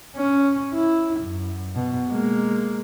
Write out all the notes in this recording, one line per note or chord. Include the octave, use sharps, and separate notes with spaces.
C#4
E4
F#2
B2
G#3 A#3